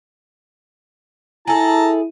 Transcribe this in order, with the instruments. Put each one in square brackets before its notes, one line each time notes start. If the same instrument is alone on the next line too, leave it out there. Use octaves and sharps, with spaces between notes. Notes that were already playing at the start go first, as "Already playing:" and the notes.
[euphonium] E4 [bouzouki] G#4 A4 [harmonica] A5 A#5